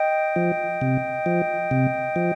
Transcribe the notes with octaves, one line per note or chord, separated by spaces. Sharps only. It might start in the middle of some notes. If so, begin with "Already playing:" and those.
Already playing: D#5 G5
F3
C3
F3
C3
F3